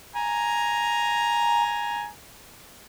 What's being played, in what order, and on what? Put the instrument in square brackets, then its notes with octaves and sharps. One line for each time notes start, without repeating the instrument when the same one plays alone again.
[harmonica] G#5 A#5